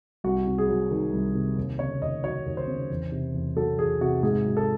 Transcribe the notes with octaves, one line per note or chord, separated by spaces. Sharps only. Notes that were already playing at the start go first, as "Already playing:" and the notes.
C2 F#4
C3
G#4
F#3
D#3
C2
C3
D#2
C#3 C#5
D#2 D#5
F#3 C#5
D#2
C5
C#3
E2
C3
E2
F#3 A4
E2 G#4
C3 F#4
G#2 G#4
F#3
A4